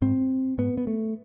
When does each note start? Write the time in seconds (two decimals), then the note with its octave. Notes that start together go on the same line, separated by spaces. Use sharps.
0.02 G#2 C4
0.58 G#2 B3
0.77 B3
0.87 A3